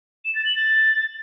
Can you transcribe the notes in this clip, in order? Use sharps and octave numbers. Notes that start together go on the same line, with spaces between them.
E7
A6
F#7
A6